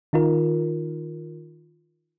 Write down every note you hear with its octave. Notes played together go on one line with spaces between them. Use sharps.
D#3 D#4 F4 A#4